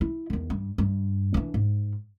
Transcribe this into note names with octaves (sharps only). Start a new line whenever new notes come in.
E4
E2 D#3
G2
G2
E3 D4
G#2